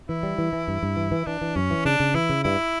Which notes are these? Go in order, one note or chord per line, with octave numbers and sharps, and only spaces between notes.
E3 E4
G3
E3
E3
G2
G2
E3
E3
E3 D4
E3
F#2 C#4
E3
C#3 D4
C#3
E3 E4
C#3
G2 E4